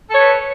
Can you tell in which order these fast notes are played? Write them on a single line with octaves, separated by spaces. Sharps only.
A4 C#5 B4